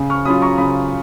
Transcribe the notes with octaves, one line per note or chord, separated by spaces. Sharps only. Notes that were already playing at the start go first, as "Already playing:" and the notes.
Already playing: C#3
C#6 F6
F#3 C#4 F4 B5 D#6
A#5 C#6
C#3 B5 D#6